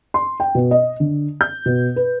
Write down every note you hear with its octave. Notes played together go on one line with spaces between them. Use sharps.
C6
G5
B2
D#5
D3
G6
B2
B4